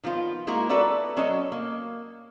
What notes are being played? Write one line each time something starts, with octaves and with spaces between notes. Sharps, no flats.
D#3 F3 B3 F4
G#3 A#3 E4 F#4 A#4
F#4 A4 B4 D5 E5 F#5
F#3 C#4 F#4 A4 D#5
A#3